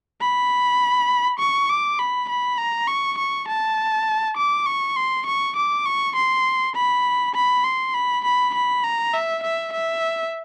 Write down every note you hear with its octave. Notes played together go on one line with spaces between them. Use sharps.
B5
C#6
D6
B5
B5
A#5
C#6
C#6
A5
D6
C#6
C6
C#6
D6
C#6
C6
B5
B5
C6
B5
B5
B5
A#5
E5
E5
E5